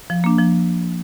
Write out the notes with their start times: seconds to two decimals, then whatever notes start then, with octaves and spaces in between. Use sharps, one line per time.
0.10 F3
0.24 A#3 D4
0.39 F3